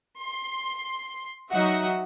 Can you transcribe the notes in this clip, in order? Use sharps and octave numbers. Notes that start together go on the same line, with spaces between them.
C6
F#3 D#4 F#4 D#5 E5 F#5